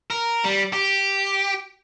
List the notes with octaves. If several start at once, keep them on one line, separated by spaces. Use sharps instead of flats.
A#4
G3
G4